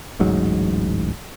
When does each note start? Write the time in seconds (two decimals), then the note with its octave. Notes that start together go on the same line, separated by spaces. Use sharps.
0.19 D1 A1 G#2 F#3